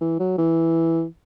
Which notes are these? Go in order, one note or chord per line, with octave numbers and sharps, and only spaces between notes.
E3
F#3
E3